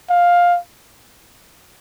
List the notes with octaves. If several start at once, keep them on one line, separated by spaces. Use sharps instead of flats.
F5